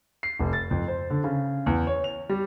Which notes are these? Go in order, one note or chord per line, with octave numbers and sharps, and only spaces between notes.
C7
F1
A6
F2
C5
D3
C#3
E2
C#5
F7
G3